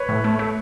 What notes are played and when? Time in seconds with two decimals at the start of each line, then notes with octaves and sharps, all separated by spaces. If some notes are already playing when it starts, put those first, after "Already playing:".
Already playing: B4 C#5
0.09 A2
0.24 A3
0.39 A3